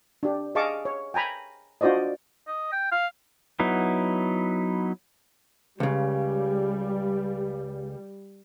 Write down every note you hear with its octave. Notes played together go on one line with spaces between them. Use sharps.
D4 G4
G#4 D#5 F5 A5 C#6 D6
C#5
G5 G#5 A#5 B5
D4 F4 F#4 C5 D5 D#5
D#5
G5
F5
F#3 B3 D#4 E4
C#2 C#3 G3